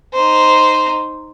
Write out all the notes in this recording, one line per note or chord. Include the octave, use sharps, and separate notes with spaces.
D#4 C5